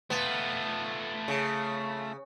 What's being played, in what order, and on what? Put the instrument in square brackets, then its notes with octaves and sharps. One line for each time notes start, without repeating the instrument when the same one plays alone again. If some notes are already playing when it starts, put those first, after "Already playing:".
[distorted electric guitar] A3 F4 [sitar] B3
[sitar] C#3